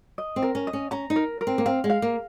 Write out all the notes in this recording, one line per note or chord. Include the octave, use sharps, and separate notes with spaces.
D#5
C4
A#4
C#4
D#5
C#4
C#4 A#5
D#4
A#4
A#4
C4
A#3
C4 F5
G#3
F5
A#3